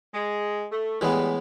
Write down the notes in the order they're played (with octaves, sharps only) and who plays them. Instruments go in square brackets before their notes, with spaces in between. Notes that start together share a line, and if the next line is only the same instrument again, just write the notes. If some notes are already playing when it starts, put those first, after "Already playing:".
[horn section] G#3
A3
[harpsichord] A2 E3 G#3 B3 [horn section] G3